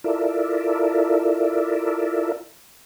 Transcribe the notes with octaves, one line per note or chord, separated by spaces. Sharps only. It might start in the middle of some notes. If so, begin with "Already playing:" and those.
E4 F4 A4 A#4 D5 E5